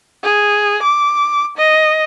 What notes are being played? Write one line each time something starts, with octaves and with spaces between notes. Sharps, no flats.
G#4
D6
D#5